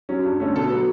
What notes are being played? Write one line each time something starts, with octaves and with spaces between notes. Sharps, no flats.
F#3 C#4
G2
D3 A3 C#4
B2 A4
F#3 B3